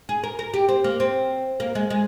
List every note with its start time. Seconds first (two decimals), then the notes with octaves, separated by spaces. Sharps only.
0.09 G#4
0.24 A#4
0.39 A#4
0.54 G4
0.68 C4
0.84 A#3
1.00 C4
1.60 A#3
1.75 G#3
1.90 G#3